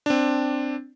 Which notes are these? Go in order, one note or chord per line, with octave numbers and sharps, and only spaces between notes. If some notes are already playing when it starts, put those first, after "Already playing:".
C4 D4